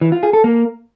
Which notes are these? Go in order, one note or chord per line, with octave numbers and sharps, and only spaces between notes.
E3
F4
G#4
A4
A#3